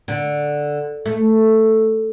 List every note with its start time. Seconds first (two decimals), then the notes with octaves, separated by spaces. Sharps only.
0.08 D3
1.05 A3